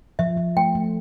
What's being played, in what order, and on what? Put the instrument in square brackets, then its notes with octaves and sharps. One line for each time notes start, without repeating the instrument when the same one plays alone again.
[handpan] F3 [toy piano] E5
[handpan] F3
[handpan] A3 [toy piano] G5
[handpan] A3